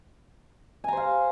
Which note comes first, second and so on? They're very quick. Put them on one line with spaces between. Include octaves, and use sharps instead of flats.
G#5 A#5 C5 F5